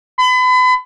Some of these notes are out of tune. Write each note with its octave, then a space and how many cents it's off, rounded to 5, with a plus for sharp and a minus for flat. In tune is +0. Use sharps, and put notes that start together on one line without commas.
B5 +35